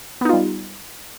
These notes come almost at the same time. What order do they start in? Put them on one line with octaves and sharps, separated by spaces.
B3 D#4 F4 G3